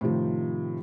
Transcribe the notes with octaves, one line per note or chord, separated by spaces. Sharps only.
A2 C3 D#3 F3